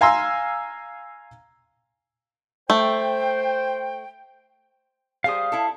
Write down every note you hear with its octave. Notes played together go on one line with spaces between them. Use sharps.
F5 G#5 A#5 C6 E6
A3 C5 G5
G3 G#4 C5 F5 D#6
E4 A4